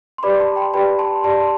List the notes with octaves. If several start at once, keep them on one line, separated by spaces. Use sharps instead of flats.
C6
G4 B4 D5 B5 D6
A5 C6
G5 B5
G4 B4 D5 G5 B5
A5 C6
G4 D5 A5 C6